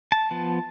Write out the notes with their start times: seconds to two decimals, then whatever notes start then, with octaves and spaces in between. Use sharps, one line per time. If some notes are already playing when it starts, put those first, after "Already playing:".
0.12 A5
0.31 F3 B3